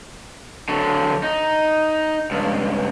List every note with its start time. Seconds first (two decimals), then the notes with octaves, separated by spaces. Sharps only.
0.69 D3 F#3
1.23 D#4
2.31 C#2 G2